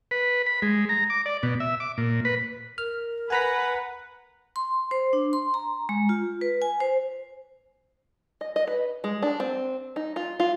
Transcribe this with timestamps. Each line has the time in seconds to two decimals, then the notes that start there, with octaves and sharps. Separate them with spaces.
0.11 B4
0.46 B5
0.62 G#3
0.89 A#5
1.10 D6
1.26 D5
1.43 B2
1.60 E5
1.80 D6
1.98 A#2
2.25 B4
2.78 A#4 F6
3.30 B4 F#5 G#5 A#5 B6
4.56 C6
4.91 C5
5.13 D4
5.33 C6
5.54 A#5
5.89 G#3
6.09 F4
6.41 B4
6.62 G#5
6.80 C5
8.41 D#5
8.56 D#5
8.67 B4
9.04 G#3
9.23 D4
9.40 C4
9.96 D#4
10.16 F4
10.40 F4